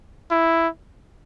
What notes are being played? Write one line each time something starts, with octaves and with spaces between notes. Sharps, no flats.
E4